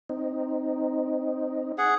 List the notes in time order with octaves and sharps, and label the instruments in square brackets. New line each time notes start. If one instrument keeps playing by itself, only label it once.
[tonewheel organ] C4 D#4
[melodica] G#4 F#5